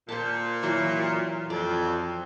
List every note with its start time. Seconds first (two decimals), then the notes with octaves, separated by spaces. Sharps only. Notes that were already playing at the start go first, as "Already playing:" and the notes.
0.09 A#2 C5 A5
0.63 E3 F#3 F#4
1.50 F2 D5